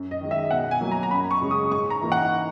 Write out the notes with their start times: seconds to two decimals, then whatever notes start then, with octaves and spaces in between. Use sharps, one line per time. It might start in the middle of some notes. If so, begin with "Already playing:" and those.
Already playing: F#2
0.11 D#5
0.21 D#3 G#3
0.31 E5
0.51 B2 F#5
0.71 G#5
0.81 F#3 A#3
0.91 A#5
1.03 A#5
1.11 F#2 B5
1.31 C#6
1.41 C#3 G#3 C#4
1.51 D#6
1.71 G#2 C#6
1.90 A#5
2.01 E3 A#3 D#4
2.12 F#5